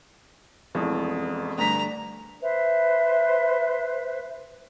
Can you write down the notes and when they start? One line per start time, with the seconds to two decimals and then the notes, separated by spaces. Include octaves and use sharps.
0.75 E1 A1 F2
1.58 D2 G2 A#5 B6
2.42 B4 C5 E5